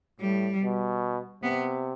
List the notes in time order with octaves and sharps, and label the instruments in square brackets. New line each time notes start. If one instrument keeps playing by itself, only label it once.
[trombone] A2 [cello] G3
[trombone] B2
[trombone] C3 [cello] B3